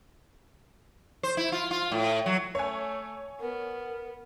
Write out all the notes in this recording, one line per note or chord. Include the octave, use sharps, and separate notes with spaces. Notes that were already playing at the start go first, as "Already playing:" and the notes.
C5
E4
F4
F4
A2
F#3
A3 C#5 G#5
B3 A#4